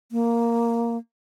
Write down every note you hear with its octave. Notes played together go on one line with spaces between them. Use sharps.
A#3